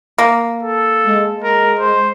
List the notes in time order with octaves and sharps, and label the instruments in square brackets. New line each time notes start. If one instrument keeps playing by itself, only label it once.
[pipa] A#3
[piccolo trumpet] A4
[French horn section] G#3
[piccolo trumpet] A#4
C5